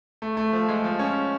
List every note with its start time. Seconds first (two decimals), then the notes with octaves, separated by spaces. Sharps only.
0.22 A3
0.37 A3
0.53 F3
0.69 G#3
0.84 F3
0.99 C#4